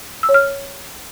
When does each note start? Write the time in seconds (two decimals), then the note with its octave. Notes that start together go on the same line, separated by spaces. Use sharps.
0.23 E6
0.29 C#5
0.34 F6